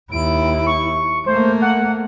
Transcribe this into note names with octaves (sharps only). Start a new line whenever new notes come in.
D#2 E4 D7
C#6
A3 A#3 C5
F#5